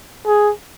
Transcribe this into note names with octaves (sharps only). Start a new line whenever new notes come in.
G#4